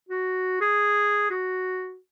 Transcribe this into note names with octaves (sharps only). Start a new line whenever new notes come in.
F#4
G#4
F#4